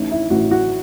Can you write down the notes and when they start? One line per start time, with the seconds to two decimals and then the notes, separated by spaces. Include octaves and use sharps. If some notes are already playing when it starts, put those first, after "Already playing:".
Already playing: A1 A2 E3 D#4
0.11 E4
0.30 A1 A2 E3 F#4
0.51 F#4